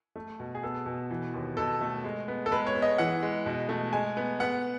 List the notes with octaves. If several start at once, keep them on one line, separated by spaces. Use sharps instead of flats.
A3
B2
G#4
B3 A4
B2
E3
D#2
B2 A4
A3
G#3
B3
A4
G#3 B4
C#5
B3
D#5
E3 F#5
G#3
B2
A3
G#3 G#5
B3
B3 F#5